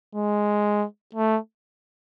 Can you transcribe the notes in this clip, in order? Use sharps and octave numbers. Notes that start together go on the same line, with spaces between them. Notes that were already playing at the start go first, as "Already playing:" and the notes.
G#3
A3